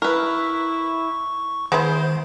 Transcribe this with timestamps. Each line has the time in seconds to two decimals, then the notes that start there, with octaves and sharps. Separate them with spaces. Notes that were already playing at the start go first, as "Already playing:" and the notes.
0.02 E4 A#4 B4 C#6
1.72 D#3 G#3 B3 E4 C5